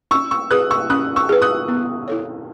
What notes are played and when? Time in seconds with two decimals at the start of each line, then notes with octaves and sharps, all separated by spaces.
0.11 C#4 C#6 E6
0.31 C#6 E6
0.51 G#4 B4 D#6 F#6
0.71 C#6 E6
0.90 C#4 D#6 F#6
1.16 C#6 E6
1.29 G#4 B4
1.42 D#6 F#6
1.68 B3
2.08 E4 A4 C#5